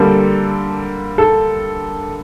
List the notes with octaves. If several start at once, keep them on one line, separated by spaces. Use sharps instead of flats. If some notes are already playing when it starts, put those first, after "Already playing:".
Already playing: D3 G3 A#3 A4
A4